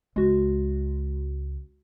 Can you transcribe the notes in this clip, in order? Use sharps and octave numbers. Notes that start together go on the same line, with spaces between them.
C#2 G#3 F#4